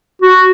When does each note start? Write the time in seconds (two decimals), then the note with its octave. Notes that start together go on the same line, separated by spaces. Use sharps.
0.22 F#4